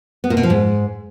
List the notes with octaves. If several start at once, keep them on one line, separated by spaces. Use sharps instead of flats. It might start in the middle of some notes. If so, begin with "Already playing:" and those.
B3
A#2
B2
F3
G#2